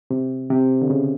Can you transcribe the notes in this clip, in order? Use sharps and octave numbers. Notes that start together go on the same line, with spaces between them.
C3
C3
D3
C#3